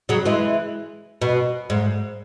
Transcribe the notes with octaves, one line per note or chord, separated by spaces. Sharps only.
C#3 F#3
E3 G#3
B2
G#2